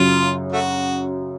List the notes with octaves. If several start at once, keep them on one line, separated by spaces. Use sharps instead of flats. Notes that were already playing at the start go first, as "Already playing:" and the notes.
Already playing: F#2 C#3 F#3 F4
A3 F#4